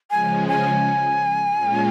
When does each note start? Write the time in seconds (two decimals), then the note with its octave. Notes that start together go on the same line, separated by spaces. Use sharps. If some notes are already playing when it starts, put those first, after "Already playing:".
0.10 C#3 F3 G#3 C#4 G#5
0.48 G#5
1.57 A#2 G#3 C#4 F4